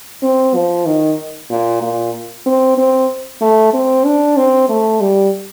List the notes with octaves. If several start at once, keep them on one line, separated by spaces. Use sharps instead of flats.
C4
F3
D#3
A#2
A#2
C4
C4
A3
C4
D4
C4
A3
G3